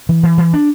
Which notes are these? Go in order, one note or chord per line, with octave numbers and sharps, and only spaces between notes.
E3
E3
E3
D4